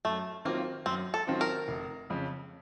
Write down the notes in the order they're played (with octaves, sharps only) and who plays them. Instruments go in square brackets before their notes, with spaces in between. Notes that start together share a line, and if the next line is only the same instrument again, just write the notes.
[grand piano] F#2 [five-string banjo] A3
[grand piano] D#3 F#3 C4 F4 [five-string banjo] A#3
[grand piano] F#2 [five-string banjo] C4
[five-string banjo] A4
[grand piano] D#3 F#3 C4 F4
[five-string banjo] A#4
[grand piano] F1
F2 C#3